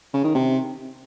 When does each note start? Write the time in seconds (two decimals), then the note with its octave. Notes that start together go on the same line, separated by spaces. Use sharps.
0.14 C#3
0.24 D#3
0.35 C3